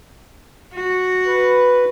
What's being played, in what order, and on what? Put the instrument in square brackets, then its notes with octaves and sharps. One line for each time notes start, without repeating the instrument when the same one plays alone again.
[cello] F#4
[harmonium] B4